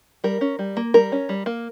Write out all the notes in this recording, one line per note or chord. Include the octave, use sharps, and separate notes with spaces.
G3 A#4
C#4
G3
A#3
G3 A#4
C#4
G3
A#3